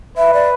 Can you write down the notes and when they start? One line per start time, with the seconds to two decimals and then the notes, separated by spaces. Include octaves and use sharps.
0.17 B4 E5
0.33 D5